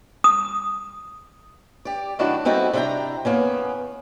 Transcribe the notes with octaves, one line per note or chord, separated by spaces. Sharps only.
D#6
G4 D5
F#2 D#3 A3 D4 E4 F#4
G3 C4 D#4 E4 F#4 A4
C3 D4 E4 A4 G5 A#5
E2 A#3 B3 C#4